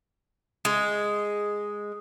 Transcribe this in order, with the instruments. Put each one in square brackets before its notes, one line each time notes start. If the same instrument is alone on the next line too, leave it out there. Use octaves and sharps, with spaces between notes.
[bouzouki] G#3 [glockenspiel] D#6